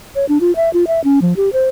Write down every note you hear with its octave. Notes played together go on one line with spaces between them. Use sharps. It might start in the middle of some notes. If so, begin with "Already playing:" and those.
C#5
D4
F4
E5
F4
E5
C#4
F3
G4
C5